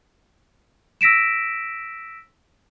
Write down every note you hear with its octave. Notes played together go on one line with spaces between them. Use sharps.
E6 A#6 B6 D7 E7